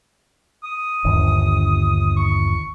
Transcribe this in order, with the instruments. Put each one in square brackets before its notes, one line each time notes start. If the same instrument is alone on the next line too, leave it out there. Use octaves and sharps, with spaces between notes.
[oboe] D#6
[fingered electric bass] G1 D#2 D3
[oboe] C#6